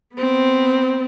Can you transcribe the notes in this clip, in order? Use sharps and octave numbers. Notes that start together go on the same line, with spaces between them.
B3 C4